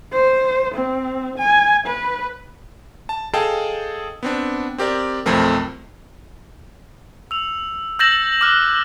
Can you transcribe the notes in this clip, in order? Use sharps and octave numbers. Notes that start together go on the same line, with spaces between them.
C5
C4
G#5
B4
A5
G#4 A4 D#5 F5 G5 A5
B3 C4 D4
C4 G4 A#4 D5
B1 F2 F3 A3 C4 A#4
E6 F7
E6 G6 A6 A#6 E7 F#7
D6 F6 F#6